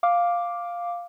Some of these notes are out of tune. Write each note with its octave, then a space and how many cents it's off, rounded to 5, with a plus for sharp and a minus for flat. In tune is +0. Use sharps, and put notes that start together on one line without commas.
F5 +0 D6 +0